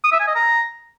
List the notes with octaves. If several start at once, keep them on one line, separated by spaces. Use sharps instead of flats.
D#6
E5
G#5
D#5
A#5